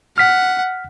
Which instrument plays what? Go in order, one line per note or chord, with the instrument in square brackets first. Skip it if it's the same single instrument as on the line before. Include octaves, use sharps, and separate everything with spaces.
[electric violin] F#5 [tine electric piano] F6 B6